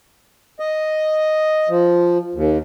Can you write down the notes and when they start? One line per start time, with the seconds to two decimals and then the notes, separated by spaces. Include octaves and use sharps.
0.60 D#5
1.69 F3
2.35 D#2